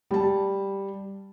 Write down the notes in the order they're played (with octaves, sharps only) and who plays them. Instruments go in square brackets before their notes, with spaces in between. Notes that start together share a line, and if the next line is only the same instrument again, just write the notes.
[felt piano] G3 A5